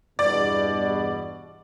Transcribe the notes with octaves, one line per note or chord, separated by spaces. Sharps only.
E2 G2 B2 D5